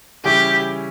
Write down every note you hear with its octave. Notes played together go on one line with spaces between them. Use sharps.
C#3 E3 G3 C#4 E4 G4